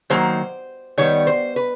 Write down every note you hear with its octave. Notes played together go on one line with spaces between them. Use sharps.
D#3 F#3 A#3 C5
D#3 G3 B3 C#5
C5
B4